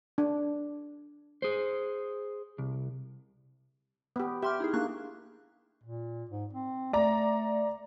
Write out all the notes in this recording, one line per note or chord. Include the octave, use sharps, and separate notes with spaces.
D4
G#4 C5
C2
B3 G4
G4 E5 C6 F6
D#4 E4 G#4
A#3 D4 C#6 F#6
A#2
G#2
C4
A3 D5 A#5